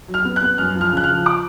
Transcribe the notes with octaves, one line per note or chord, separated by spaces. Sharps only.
F#3
F6
B3
F#6
B3
F#2 F6
F3
F6
C#3 F#6
F6
F3
D6